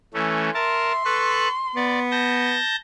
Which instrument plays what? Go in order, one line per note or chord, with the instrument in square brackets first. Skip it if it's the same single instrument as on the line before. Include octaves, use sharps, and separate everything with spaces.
[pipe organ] E3 A3 C#4
[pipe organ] A#4 A5 [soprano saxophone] E5 [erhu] C6
[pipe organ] A4 B4 F#6 [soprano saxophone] C#6
[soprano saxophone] B3 [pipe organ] D5
[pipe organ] A5 G6 A#6